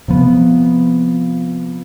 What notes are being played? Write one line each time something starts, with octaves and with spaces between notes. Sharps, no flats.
C3 F3 B3